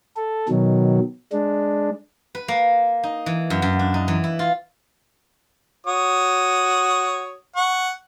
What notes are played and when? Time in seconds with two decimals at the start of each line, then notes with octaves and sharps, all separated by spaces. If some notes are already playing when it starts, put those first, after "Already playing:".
0.17 A4
0.49 B2 D#3 F#3
1.32 G#3 D4
2.35 B4
2.48 A#3
3.03 D#4
3.26 E3
3.50 F#2
3.62 F#2
3.79 D4
3.94 D#4
4.08 E3
4.24 E4
4.39 F4
5.86 F#4 C#5 D#6
7.56 F#5 C#6